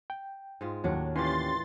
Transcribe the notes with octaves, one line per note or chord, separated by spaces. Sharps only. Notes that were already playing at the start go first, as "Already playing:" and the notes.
G5
G#2 G#3 F4
D#2 A2 F#3 D4
E3 C#4 F4 G4 D5 C6 A6